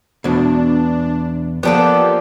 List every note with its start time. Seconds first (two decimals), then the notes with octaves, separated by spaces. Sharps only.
0.24 E2 B2 D4
1.63 F3 A#3 B3 D4 G4 A4